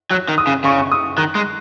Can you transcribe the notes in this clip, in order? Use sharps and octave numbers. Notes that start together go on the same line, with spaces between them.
F#3 F#6
D#3
D#6
C#3
C#3 C#6
C#6
D#6
D#3 F#6
G#3